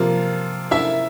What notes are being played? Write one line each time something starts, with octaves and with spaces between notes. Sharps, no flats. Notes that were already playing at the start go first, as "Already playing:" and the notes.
Already playing: C3 F3 A#3 F4
E4 E5